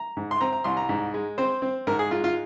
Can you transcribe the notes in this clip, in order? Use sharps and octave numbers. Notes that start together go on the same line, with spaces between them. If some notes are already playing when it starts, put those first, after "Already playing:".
Already playing: A#5
G#2
C6
C4 A#5
A#5
C2 C6
A#5
G#2
G#3
C4 C5
C4
G#2 A#4
G#4
G#3 F4
F4